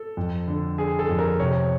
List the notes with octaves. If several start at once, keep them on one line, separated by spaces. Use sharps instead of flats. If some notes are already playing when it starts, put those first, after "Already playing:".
Already playing: A4
F2
D3
D3 G#4
A4
F2
A#4
C3 C#5